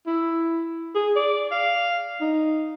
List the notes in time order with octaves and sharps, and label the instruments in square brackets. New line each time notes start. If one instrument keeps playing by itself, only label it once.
[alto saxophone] E4
G#4
D5
F5
D#4